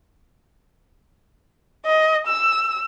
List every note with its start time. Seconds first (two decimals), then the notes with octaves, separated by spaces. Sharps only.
1.86 D#5
2.27 E6